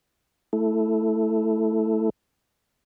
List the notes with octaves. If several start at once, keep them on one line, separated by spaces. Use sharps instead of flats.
A3 E4 A4